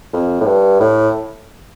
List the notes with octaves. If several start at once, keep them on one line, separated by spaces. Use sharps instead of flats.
F2
A2
G2
A2